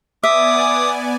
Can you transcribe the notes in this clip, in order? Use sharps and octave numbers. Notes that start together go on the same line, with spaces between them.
B3 D5 E5 G#5 D6 D#6